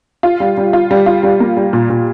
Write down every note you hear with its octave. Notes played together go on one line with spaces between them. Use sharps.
F4
G3
G3
F4
G3
F4
G3
A#3
G3
A#2
A#2